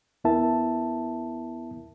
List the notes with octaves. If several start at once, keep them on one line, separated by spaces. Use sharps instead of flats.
D#2 B3 E4 A#4 E5 A5